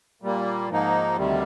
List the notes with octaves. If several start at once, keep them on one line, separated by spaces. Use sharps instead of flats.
A#2 G3 A#3
G#2 F3 A#3 D#4
D2 C3 D#3 G3